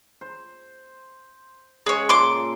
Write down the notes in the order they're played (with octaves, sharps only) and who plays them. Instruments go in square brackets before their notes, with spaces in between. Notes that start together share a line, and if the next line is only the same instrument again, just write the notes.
[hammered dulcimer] C5
[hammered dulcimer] C#3 G#3 [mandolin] G#4 C#5
[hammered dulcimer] A#2 A4 [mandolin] C6 D6